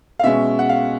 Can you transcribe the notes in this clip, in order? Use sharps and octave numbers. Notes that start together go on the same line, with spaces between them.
F5
B2 G#3 C#4 E5
F#5
F5